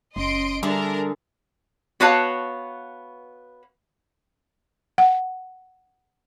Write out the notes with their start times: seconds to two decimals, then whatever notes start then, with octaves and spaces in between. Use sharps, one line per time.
0.16 F#1 C#4 D#5 C6 D7
0.63 D3 G3 D4 G#4 A#4 E5
2.00 B3 F#4 B4 C#5 F5 A5
4.98 F#5